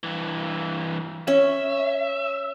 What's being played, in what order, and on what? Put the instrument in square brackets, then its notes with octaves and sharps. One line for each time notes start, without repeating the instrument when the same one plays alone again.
[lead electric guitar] G2 E3
[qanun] C#4 [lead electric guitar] E5